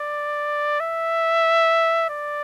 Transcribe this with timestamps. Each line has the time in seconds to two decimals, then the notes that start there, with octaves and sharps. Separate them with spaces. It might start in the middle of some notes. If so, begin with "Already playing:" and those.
Already playing: D5
0.80 E5
2.10 D5